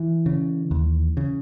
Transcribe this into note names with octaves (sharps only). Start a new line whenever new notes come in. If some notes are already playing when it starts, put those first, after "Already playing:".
Already playing: E3
C#3
D#2
C#3